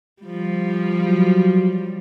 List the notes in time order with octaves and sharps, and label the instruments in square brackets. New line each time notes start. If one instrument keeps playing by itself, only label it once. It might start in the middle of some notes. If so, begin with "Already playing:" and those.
[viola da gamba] F3 G3
[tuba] F#3